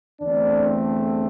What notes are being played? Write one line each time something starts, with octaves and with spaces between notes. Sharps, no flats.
E2 D3 A3 C4 D4